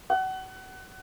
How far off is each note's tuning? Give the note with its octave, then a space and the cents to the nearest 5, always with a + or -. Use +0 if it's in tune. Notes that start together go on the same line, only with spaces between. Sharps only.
F#5 +30